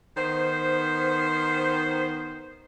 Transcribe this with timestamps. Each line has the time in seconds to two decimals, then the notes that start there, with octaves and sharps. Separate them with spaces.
0.17 D#3 B3 C5